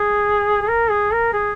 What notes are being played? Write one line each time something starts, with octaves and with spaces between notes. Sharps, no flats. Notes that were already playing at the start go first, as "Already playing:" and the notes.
Already playing: G#4
G#4
A#4
G#4
A#4
G#4